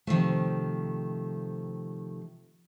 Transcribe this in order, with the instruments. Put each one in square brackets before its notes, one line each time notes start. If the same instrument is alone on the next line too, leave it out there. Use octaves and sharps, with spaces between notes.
[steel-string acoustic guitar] C3 D#3 F3 A3